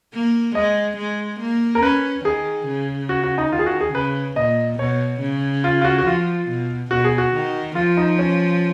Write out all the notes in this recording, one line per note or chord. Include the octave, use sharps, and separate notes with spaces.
A#3
G#3 D#5
G#3
A#3
A#4
C#4 B4
D#3 G#4
C#3
F#4
F#4
D#4
D#3 F4
G#4
F#4
G#4
C#3 B4
A#2 D#5
B2 C#5
C#3
F4
F4
F#4
F#4
F3 F4
B2
B2 F#4
G#4
F#4
D#3
F3 F4
D#4
C#4